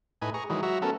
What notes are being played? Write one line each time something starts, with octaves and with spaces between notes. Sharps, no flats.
A2 D#4 B4 G#5
G#4 A#5 C#6
D#3 E3 F#3 G#3
F#3 F#4 E5 A#5
A3 B3 C#4 A4 A#4